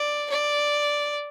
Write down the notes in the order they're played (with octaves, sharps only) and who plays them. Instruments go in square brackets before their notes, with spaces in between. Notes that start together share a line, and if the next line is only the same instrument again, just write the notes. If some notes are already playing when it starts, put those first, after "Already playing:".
Already playing: [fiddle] D5
D5